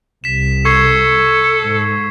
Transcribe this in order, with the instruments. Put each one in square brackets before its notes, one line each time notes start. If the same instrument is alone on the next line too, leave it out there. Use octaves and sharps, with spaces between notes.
[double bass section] C2 [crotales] B6 E7
[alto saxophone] A4 [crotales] C#6 G#6 C7
[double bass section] G#2